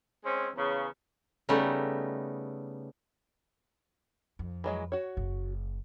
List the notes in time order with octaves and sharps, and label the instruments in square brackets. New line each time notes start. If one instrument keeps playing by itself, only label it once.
[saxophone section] G#3 C4 C#4
E2 C#3
[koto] C#3 G3 A3 B3 D#4
[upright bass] F2
[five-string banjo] E3 F#3 G#3
F#4 C#5
[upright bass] F#1 C#3